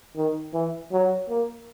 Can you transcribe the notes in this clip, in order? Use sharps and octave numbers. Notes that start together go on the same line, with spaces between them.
D#3
E3
F#3
A#3